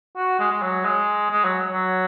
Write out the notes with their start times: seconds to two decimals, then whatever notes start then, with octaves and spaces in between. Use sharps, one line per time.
0.16 F#4
0.39 G#3
0.52 G#3
0.62 F#3
0.85 G#3
1.31 G#3
1.44 F#3
1.71 F#3